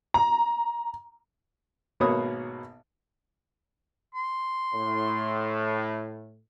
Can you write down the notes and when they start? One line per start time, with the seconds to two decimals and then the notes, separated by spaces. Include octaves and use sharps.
0.14 A#5
2.00 G#1 B2 A#3 B3 C#5 D#6
4.14 C6
4.74 A2